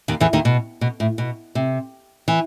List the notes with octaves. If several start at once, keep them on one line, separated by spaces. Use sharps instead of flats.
D#2 D#3
E2 E3
D#2 D#3
B2
B2
A2
B2
C3
E3